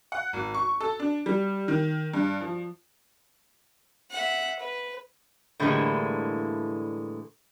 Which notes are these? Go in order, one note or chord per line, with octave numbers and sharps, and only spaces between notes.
F#5
G#1
C#6
A4
D4
G3
D#3
G2
F3
E5 F#5
B4
A2 D3 E3 G3 G#3 A#3